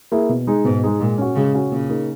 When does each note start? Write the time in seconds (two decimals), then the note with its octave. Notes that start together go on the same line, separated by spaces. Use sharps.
0.12 A#3 E4 G#4
0.29 B2
0.47 G#3 D#4 G#4
0.64 G#2 B2
0.83 G#3 D#4 G#4
1.00 A#2 G#3
1.18 C#4 F#4
1.35 C#3 G#3
1.54 C#4 F#4
1.71 A#2 C#3
1.89 A#3 D#4 G#4